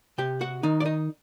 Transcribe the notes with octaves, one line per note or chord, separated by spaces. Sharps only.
C3 G4 G5
F#4 F#5
D#3 D#4 D#5
D5
D#4 D#5